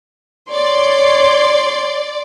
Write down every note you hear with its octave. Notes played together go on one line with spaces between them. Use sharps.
C#5 D5 C6